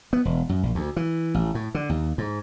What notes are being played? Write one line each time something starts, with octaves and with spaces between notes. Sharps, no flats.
B3
E1
F#2
A#1
D2
E3
A1
A2
D3
D#2
G#2